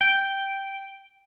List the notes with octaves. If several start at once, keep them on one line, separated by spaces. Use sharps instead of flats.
G5